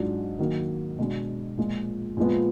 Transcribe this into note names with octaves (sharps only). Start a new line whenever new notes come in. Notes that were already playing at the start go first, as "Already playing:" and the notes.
Already playing: G#2 F#3 D4 F4
D#3 F#3 A#3
B2 G#3 D4
A#2 F3 G#3
A#2 F3 G#3 B3